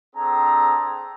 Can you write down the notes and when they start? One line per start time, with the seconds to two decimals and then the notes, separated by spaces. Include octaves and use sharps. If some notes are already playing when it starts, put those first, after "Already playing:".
0.15 C4 D4 G#4 A4 A#5